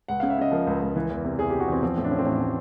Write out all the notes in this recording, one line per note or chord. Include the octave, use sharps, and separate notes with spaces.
C#2 F#5
C#3 F5
E5
C#3 D#5
F3 A#4
C#2
C#2
E3
E2
C3
E2 G#4
C3 G4
F#4
E2 C4
F3 C4
A2
D4
F3 C#4
C4
A1 C#4
A2